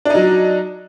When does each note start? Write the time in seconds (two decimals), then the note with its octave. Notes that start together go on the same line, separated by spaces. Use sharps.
0.05 D4
0.10 D#4
0.15 F#3